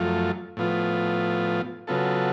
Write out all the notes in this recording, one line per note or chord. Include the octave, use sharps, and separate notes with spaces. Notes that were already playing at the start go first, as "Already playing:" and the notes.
Already playing: F#2 F3 A3 F4
A2 F3 B3 F4
C#3 F#3 B3 F4 A4